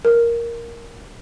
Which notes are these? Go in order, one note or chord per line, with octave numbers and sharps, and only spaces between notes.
A#4